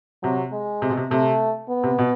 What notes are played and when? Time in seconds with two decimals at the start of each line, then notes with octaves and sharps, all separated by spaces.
0.23 C3 F#3
0.52 G#3
0.82 C3
0.90 B2
0.97 C3
1.11 C3 A3
1.69 B3
1.83 C3
1.98 B2